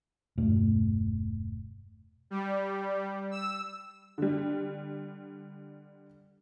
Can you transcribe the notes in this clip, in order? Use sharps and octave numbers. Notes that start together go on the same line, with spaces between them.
E1 G2 B2 A3
G3
E6
D3 G3